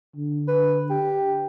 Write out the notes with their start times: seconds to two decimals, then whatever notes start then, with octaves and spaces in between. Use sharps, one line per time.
0.16 D3
0.48 B4
0.90 G4